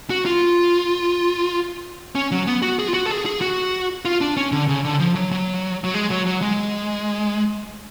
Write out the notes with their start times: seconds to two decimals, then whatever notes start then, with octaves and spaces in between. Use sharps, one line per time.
0.10 F#4
0.25 F4
2.15 C#4
2.31 F#3
2.47 B3
2.62 F#4
2.79 G#4
2.88 F4
2.94 F#4
3.06 A4
3.10 G#4
3.26 G#4
3.41 F#4
4.05 F4
4.21 D4
4.37 C#4
4.52 D3
4.68 C#3
4.84 D3
5.00 F3
5.15 F#3
5.32 F#3
5.84 F#3
5.94 G#3
6.11 F#3
6.26 F#3
6.42 G#3